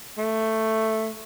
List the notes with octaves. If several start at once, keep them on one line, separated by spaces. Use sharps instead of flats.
A3